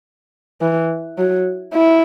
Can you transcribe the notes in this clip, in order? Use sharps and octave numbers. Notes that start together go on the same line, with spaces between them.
E3
F#3
E4